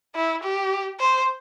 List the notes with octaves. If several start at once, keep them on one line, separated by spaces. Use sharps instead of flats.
E4
G4
C5